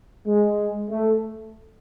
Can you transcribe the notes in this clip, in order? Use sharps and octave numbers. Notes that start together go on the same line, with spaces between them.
G#3
A3